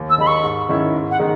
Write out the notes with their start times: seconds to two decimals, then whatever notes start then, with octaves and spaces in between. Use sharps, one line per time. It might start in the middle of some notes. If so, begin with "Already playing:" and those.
Already playing: D#2
0.10 E6
0.18 D#3 G#3 D#4 B5
0.27 C#6
0.43 G#2
0.69 D#3 G#3 C#4 E4
0.93 G#2
1.11 F#5
1.19 D#3 G#3 D#4